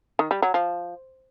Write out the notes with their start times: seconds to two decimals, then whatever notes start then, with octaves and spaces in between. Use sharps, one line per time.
0.19 D#3
0.31 G3
0.42 F#3
0.54 F3